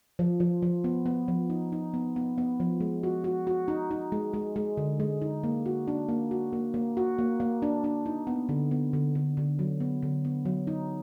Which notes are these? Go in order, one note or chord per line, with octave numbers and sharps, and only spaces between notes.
F3
F3
F3
B3
B3
F3
D#4
D#4
B3
B3
B3
F3
G#3
F#4
F#4
F#4
D#4
D#4
G#3
G#3
G#3
D3
G#3
D#4
A#3
F#4
D4
A#3
F#4
A#3
A#3
F#4
A#3
A#3
D4
D4
D#4
B3
D3
B3
D3
D3
D3
F#3
B3
D3
B3
F#3
D#4